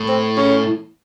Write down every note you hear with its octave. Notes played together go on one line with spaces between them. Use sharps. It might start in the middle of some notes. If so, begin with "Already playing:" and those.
Already playing: A2
C4
C#4